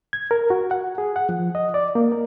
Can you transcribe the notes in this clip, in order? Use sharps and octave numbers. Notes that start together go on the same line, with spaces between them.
G#6
A#4
F#4
F#5
G#4
F#5
F3
D#5
D5
A#3
A#4